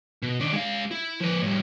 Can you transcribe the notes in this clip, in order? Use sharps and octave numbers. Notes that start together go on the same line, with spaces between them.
B2
D#3 D4
G#3 F5
E4
F3 B4
A2 G3